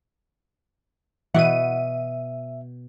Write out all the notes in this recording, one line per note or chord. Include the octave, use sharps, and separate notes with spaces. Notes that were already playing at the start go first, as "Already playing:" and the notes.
B2 E3 E5 F#5 D#7